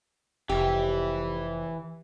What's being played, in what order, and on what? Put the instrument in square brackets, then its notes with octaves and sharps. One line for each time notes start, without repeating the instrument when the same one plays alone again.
[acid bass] F1 [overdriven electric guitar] E3 [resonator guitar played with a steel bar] G4